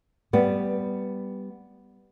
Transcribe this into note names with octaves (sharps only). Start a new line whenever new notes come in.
G3 B3